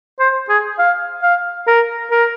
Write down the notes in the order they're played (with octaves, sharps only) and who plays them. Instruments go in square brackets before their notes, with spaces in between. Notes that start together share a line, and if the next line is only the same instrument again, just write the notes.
[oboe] C5
G#4
F5
F5
A#4
A#4